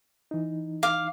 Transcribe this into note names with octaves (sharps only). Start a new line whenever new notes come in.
E3 D#4
F5 D6